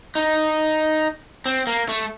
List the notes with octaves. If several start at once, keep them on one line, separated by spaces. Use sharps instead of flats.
D#4
C4
A#3
A3